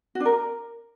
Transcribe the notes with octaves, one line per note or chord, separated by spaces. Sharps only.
F#4
D4
A#4